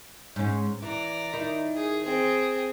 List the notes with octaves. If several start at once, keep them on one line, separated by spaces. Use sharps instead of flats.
G#2 C#4
E3 D5 A#5
D#3 E4
G#4
C4 G#4